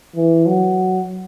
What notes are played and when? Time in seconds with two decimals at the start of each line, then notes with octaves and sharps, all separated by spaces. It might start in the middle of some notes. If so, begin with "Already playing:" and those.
0.16 E3
0.46 F#3